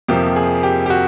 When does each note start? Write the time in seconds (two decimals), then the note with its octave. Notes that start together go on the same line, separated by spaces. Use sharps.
0.08 F2 C3 F3 A#3 G4
0.36 G#4
0.63 G4
0.86 G4
0.90 F#4